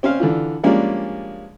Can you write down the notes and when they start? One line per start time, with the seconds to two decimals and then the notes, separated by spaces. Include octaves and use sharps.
0.03 C4 C#4 C5 F5
0.20 D3 E3 F4
0.63 F3 G3 G#3 A#3 C#4 D4